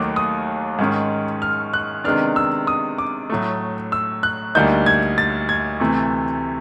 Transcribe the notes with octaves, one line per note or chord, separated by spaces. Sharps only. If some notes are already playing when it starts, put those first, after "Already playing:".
Already playing: D#2 D#3 F#3 A3 D6
D#6
G#2 D#3 G#3 C#4
F6
F#6
C3 D#3 G#3 B3 D4 F6
E6
D#6
D6
A2 F#3 A3
E6
F#6
D2 D3 G3 A#3 D#4 G6
G#6
A6
G#6
D2 C3 E3 A3